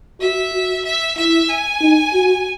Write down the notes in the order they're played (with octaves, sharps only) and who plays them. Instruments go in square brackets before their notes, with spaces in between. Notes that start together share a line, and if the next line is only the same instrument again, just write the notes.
[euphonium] F#4 [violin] E5
[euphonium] F#4
[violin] E5
[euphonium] E4 [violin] E5
[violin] G#5
[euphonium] D#4
F#4